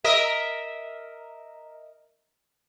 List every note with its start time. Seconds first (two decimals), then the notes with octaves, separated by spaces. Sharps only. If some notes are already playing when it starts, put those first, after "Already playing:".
0.04 A#4 D#5 E5